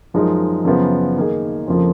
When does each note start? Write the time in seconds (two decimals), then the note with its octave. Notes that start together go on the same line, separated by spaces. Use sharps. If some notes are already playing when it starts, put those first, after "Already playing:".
0.14 F#2 F3 G#3 D#4 A#4
0.65 F#2 C#3 F3 B3
1.17 D#3 A#3 D#4 G#4
1.67 F2 C#3 F3 A#3